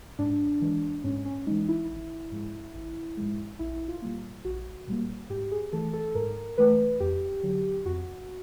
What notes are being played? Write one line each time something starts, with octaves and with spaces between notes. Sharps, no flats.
G#2 D4
E3 G#3
G#2 C#4
C#4
E3 G#3 D#4
E4
G#1
G#2 F3 G#3
G#1
G#2 F3 G#3
A#1 E4
F4
A#2 G3 A#3
A#1 F#4
A#2 G3 A#3
G#2 G4
G#4
E3 A3 A4
A4
G#2 A#4
E3 A3 B4
F2 G4
D3 F#3
F2 F#4